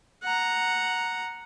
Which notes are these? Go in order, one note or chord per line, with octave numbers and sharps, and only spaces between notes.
F#5 A#5